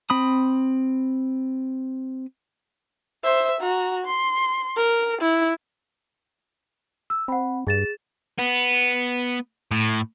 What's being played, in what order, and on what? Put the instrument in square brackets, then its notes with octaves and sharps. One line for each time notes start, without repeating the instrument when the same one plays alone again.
[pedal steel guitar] C4 B5 D#6
[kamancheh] C5 E5
F#4 A#5
C6
A#4
E4
[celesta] E6
[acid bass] C4 [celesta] F#5 B5
[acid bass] G2 [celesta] G#4 A6 E7
[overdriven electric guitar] B3
A2